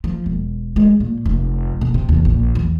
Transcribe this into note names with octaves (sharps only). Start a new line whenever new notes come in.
F3
E1
G#3
A#2
F1
B2
C3
E2
A#1
E2